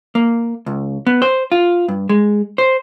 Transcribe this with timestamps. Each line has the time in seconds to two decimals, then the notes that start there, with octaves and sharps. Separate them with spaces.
0.15 A#3
0.66 C#2
1.07 B3
1.22 C5
1.52 F4
1.88 G2
2.09 G#3
2.58 C5